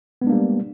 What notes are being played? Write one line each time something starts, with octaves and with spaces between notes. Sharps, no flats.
G3 G#3 A#3 B3 D4